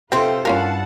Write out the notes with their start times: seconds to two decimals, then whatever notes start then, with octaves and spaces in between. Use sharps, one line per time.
0.12 C3 C4 F4 A4 B4 C5 G5
0.45 G2 C#4 E4 F4 A#4 F5 F#5 A5